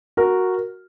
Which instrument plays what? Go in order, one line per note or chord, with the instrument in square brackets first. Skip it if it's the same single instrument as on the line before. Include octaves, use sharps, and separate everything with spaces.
[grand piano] F#4 A#4